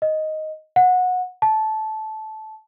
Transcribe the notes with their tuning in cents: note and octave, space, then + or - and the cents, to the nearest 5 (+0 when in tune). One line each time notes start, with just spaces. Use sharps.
D#5 +5
F#5 -20
A5 -15